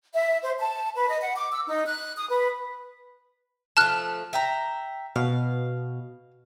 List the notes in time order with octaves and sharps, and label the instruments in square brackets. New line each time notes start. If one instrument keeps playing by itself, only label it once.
[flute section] E5
C5
A5
B4
D#5
F#5
D6
E6
D#4
F#6
D#6
B4
[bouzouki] F3 A3 [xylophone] A5 F6 F#6
[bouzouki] E5 G5 A#5
[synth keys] B2 [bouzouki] F5